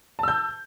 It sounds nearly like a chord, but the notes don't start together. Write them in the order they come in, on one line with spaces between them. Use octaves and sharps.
A5 E6 G6